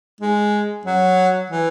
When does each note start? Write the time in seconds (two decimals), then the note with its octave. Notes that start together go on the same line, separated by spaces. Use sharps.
0.21 G#3
0.85 F#3
1.50 E3